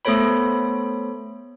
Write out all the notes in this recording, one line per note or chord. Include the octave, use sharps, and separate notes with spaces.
A3 B3 A4 C5 C#5 B5